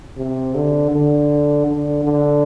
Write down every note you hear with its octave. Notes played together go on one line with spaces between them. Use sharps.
C3
D3
D3
D3
D3